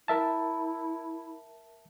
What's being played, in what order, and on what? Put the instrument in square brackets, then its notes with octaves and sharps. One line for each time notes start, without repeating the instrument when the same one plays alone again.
[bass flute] E4 [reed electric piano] A#4 E5 A5